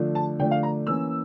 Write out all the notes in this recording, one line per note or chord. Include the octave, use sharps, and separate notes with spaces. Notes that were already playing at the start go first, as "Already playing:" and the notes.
Already playing: D3 F3 A3 D4
A5
D3 F3 A3 D4 G5
F5
A#5
E3 A#3 C#4 E6